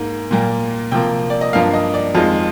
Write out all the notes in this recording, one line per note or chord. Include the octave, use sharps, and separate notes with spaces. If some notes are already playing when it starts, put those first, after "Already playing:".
Already playing: G#2 A#3
A#2 G3 A#3
C3 F3 A#3 G5
D5
D#5
G2 F3 A#3 F5
D#5
D5
F2 D#3 G#3 F4